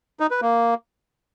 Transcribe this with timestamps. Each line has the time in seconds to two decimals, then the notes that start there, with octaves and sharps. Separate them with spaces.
0.20 D#4
0.31 B4
0.42 A#3